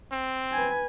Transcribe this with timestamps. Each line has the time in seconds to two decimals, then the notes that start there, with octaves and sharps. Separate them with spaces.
0.12 C4
0.52 B4 G#5